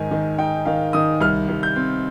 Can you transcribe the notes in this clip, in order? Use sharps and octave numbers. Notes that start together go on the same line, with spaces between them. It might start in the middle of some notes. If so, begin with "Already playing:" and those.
Already playing: G#2 D#3 G#5
D#3
D#4 G5
D#3 F5
D#3 D#6
C2 F6
C2
G6
C4